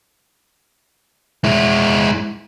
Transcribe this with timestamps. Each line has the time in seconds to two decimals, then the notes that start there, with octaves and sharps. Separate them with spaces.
1.44 G#3 E4